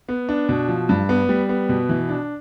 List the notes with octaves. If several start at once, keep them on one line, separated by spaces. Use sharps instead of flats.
B3
D4
B2
F3
G2
B3
G3
B3
B2
E3
D4